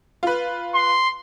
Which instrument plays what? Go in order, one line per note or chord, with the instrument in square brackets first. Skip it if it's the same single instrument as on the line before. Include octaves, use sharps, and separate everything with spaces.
[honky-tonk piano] F4 B4
[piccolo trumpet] C6